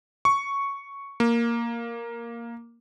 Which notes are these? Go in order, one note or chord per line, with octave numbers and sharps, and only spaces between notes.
C#6
A#3